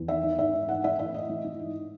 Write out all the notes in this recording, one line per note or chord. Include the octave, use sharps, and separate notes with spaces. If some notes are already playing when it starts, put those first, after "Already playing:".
Already playing: E2
D#3 E5
D#3
G#2 E5
G#2
E3 F#5
E3 E5
A2 E5
A2 D#5
E3
E3
G#2